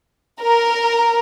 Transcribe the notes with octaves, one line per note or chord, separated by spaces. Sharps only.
A#4